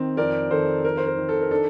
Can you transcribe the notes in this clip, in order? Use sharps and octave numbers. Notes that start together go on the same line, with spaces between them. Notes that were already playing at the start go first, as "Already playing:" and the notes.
Already playing: D#3 C4
F2 A#4 D5
D#3 A4 C5
D#3 A#4
C5
A#4
D#3
A4
A#4
D4 A4